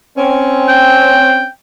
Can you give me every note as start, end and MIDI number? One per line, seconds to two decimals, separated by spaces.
0.16 1.44 60
0.16 1.44 61
0.69 1.49 79